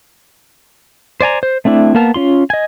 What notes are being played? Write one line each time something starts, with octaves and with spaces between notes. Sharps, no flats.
C5 D5 G#5 A#5
C5
A3 C4 D4 E4
A#3 B3 A#4 A5 F6
C#4 F4 C6
D#5 G#5